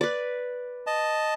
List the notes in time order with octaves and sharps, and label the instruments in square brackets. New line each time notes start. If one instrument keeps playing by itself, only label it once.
[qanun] B4 D5
[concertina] D#5 A5